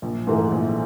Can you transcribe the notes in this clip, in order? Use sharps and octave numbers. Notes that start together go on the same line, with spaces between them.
A#1
G#2 E3 A3
A#1